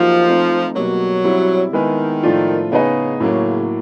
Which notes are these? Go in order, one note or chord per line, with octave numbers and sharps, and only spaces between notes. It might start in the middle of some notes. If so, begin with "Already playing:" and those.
Already playing: F3 F#3 A#3 D#4 G4
A3 C4 D#4
B2 F#3 G3 A#3
G3 C4 E4
D#3 G#3 B3 E4 G#4 B4
A2 F3 A3 D4 F4
C#3 B3 D#4 G#4 B4 D#5
A2 C#3 F#3 A#3